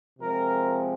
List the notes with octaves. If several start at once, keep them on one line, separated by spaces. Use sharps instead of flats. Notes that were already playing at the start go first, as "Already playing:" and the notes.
C3 F3 G#3 C4 A#4